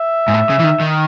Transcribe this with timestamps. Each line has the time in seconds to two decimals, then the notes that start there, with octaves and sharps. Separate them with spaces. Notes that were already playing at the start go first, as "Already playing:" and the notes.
Already playing: E5
0.28 G#2
0.34 A2
0.50 C#3
0.60 E3
0.64 D#3
0.81 D#3